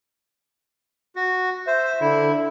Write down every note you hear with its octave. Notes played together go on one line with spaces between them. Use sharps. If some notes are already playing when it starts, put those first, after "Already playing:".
F#4
C5 E5
D3 E4